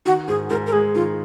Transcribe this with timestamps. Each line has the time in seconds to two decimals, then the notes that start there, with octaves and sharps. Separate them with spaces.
0.05 D#3 F#4
0.28 G#2 G#4
0.50 G#2 A#4
0.67 A#4
0.72 G#3 G#4
0.95 D#3 F4